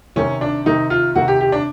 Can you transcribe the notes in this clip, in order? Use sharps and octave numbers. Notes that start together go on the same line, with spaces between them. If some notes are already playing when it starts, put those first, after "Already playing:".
C3 D#3 C#4
D4
C3 D#3 D#4
F4
C3 D#3 F#4
G4
G4
D4